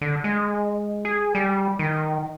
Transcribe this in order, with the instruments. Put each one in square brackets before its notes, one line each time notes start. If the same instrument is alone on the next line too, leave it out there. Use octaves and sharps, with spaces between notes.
[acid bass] D3
G#3
G#4
G3
D#3